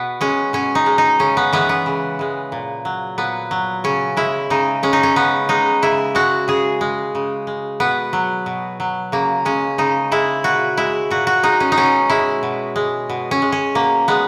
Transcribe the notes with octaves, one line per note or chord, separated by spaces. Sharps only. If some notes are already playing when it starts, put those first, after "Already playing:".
Already playing: B2 B3
G#3 C#4
B2 C#4
D#4
G#3
D#4
C#3 C#4
B3
E3 G#3 B3
B3
C#3
E3 G#3
A#2
F#3
A#2 B3
F#3
C#3 C#4
G#3 E4
C#3 D#4
G#3 C#4
D#4
C#4
C#3 B3
G#3 D#4
C#3 E4
G#3 F#4
C#3 G#4
G#3
C#3
G#3
B2 B3
F#3
B2
F#3
C#3 A#3
G#3 C#4
C#3 D#4
G#3 E4
A#2 F#4
G#3 E4
A#2 F#4
F#4
G#3 D#4
C#4
D#4
B2 C#4
G#3 E4
B2
G#3
B2
C#4
G#3
C#4
B2 A#3
G#3 B3